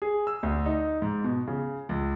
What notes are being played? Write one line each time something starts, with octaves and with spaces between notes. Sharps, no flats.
G#4
E6
D2
D#4
G#2
B2
C#3
C#2